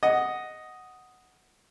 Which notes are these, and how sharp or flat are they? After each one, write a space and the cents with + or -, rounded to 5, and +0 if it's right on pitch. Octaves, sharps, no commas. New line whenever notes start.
D#5 +0 F#5 +0